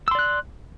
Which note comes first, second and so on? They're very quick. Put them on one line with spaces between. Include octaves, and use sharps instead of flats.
E6 C6 D5 F#6